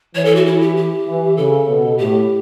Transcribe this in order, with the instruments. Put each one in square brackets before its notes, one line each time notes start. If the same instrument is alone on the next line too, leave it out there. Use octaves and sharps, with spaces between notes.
[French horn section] E3 [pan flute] C#5
[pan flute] A4
F#4
E4
G4
G4
[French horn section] E3
[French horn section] C#3 [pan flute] A4
[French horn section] B2
[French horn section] A2 [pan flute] G4